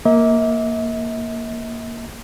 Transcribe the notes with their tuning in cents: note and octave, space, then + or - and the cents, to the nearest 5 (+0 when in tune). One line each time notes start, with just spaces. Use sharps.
A#3 +0 E5 -45